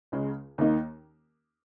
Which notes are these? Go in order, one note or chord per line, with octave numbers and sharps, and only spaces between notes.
C#2 C#3 G#3
D#2 D#3 A#3 D#4